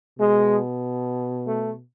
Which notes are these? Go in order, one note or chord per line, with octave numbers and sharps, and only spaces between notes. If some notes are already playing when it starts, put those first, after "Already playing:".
B2 G#3
A3